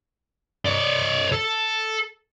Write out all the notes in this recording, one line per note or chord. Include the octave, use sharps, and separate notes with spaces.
C#5 D5
A4